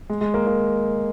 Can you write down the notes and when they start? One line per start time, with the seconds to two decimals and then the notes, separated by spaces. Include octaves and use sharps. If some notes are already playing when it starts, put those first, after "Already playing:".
0.09 G#3
0.21 G#3
0.34 A#3
0.47 A#3